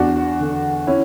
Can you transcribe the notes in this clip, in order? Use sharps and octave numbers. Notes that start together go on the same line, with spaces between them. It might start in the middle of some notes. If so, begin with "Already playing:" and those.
Already playing: E2 D4 F#4
D3
C#4 E4